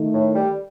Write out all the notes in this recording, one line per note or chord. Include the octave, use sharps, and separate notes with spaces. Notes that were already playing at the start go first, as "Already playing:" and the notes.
Already playing: D#3 A3 D#4
A2
G3